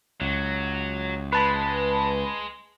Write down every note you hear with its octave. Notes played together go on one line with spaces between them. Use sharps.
C#2 F#3
G#3 B4 A5 B5